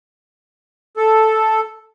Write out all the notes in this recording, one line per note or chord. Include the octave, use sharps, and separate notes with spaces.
A4